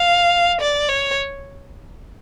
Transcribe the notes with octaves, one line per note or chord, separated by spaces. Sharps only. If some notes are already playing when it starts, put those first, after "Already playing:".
Already playing: F5
D5
C#5